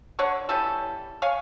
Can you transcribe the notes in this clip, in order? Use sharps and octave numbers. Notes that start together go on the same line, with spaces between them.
D3 C#5 F#5 C#6
E3 G3 C#4 A4
C#5 F5 G#5